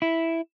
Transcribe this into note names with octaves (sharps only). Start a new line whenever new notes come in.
E4